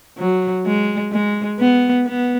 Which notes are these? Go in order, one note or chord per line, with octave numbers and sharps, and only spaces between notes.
F#3
G#3
G#3
B3
B3